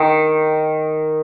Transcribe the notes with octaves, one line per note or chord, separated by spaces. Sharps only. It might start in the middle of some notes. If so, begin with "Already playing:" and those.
Already playing: D#3